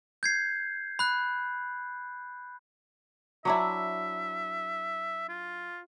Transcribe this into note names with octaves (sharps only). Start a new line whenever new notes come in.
G6 G#6 C7
B5 F#6
F#3 D4 E4 E5
F4